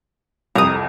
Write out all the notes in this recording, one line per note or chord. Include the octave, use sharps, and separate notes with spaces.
C2 F2 A#5 D#6